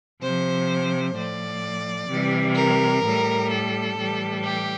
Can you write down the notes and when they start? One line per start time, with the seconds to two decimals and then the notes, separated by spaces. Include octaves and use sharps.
0.21 C3 F3 C5
1.15 A2 F3 D5
2.09 C3 E3 G3
2.56 A#4
3.03 A2 G3
3.50 A4
3.97 A2 E3 G3
4.44 G4